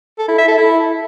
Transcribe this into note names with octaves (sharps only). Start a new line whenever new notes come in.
A4
E4
E5
A4
E4